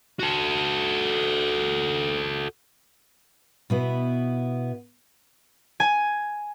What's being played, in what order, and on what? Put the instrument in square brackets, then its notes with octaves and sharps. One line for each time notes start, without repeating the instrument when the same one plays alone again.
[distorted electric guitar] F#4 A4
[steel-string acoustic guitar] B2 B3 E4
[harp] G#5